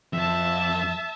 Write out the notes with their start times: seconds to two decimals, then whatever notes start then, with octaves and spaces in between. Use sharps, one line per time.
0.13 F2 E5 A5